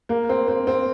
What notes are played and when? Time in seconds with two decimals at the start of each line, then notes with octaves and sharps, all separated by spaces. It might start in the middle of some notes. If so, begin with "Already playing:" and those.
0.09 A#3
0.29 C4
0.48 C4
0.67 C4